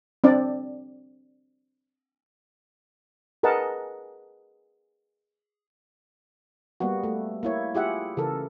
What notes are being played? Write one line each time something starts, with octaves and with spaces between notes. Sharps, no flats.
C4 D4 D5
G#4 A#4 B4 D#5 F#5 A5
G3 A#3 B3 F#4
A3
A#3 E4 C#5
E4 F4 G4 G#4 E5 F#5
C#3 E3 A4 A#4